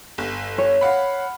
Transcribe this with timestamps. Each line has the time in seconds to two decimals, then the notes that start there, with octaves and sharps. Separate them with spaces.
0.18 G1
0.58 C#5
0.81 F5 F#5 B5